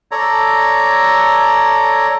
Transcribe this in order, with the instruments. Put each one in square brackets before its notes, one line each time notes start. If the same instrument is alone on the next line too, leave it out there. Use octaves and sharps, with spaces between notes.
[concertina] A4 C#5 D5 A#5